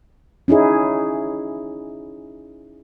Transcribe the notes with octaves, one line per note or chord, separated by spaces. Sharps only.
C#4 D#4 E4 G#4